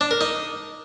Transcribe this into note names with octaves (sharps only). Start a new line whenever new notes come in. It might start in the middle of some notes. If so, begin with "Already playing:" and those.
D4
A#4
D#4